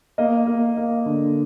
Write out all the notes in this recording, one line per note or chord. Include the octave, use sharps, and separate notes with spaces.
A#3 D#5
A#3
A#3
D3